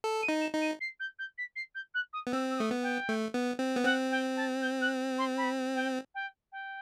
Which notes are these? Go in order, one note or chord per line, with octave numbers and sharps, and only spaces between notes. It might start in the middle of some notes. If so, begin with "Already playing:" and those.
A4
D#7
D#4
E7
D#4
D#7
C7
G6
G6
B6
C7
G6
F#6
D#6
B3
C4 E6
E6
A3 D#6
B3
G5
A3
B3
C4
B3
C4 F#5
G5
A5
G6
F#6
C6
B5
G5
G5
G5